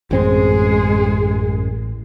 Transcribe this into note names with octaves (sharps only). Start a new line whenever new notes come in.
A1 F#2 G#3 C4 G#4